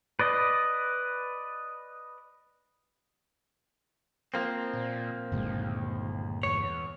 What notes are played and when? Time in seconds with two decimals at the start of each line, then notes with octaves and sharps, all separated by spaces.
0.19 B4 D5 D#5
4.34 F3 A#3 C4
4.74 A#2
5.32 G1 D#2 A#2 G#3
6.43 E2 C#5